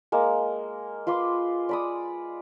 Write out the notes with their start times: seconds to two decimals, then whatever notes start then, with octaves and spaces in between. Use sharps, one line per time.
0.12 G#3 A#3
1.07 F4 B4 C6 D6
1.69 D5 B5 D#6